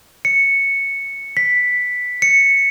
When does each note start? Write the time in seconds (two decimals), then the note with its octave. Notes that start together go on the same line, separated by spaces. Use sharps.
0.25 C#7
1.37 B6
2.22 C#7